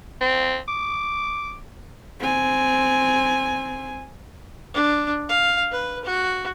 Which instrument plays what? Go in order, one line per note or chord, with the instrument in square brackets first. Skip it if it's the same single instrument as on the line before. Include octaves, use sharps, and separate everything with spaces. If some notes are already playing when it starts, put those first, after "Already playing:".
[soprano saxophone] C4
D6
[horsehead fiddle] C4 G#5
[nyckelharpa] D4
F5
B4
F#4